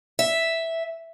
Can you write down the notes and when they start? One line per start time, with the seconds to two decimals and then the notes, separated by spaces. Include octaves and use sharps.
0.19 E5